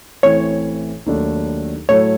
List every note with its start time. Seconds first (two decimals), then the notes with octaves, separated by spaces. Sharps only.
0.23 A1 A2 E3 A3 C4 C#5
1.06 D#2 D#3 F#3 A3 D4
1.89 A2 F#3 A3 C#5